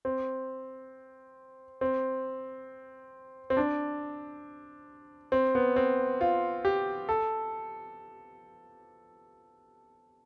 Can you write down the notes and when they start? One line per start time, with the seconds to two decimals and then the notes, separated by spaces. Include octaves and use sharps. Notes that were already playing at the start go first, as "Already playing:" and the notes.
0.05 C4
1.81 C4
3.50 C4
3.57 D4
5.32 C4
5.55 B3
5.76 C4
6.21 F4
6.65 G4
7.09 A4